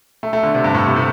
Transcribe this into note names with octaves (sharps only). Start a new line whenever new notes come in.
A3
A3
D3
C3
G2
A2
C3
A2